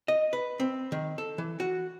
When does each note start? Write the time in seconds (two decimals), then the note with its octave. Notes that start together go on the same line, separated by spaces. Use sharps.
0.08 D#5
0.33 B4
0.60 C4
0.92 D#3
1.18 A4
1.38 E3
1.60 F#4